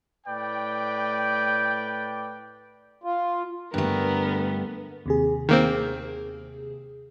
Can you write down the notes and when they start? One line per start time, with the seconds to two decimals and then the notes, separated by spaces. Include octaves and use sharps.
0.26 A2 B4 D5 G5
3.04 F4
3.74 G2 D3 A3 B3 A#4
5.06 D#2 C3 G#4
5.49 D#3 A#3 C4